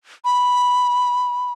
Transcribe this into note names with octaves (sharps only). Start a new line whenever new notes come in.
B5